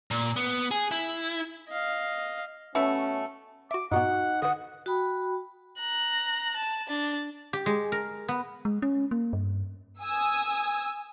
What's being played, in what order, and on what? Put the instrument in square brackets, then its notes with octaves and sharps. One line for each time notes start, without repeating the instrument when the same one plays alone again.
[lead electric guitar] A#2
B3
G#4
E4
[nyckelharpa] D#5 F5
[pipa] B2 A3 [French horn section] C#4
[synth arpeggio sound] F#4 E5 [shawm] D6
[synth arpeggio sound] G2 A#2 B3 [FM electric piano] D#4 F#4 [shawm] F#5
[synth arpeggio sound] D3 B4 [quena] F#5 [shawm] D#6
[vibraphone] F#4 G5 B5
[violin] A#5 F#6
A5
D4 A6
[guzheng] G4
G#3
A#4
B3
[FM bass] G#3
C#4
A#3
G2
[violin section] G#5 D#6 E6